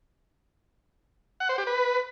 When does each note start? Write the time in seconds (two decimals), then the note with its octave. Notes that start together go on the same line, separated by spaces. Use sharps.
1.40 F#5
1.49 C5
1.58 G4
1.67 B4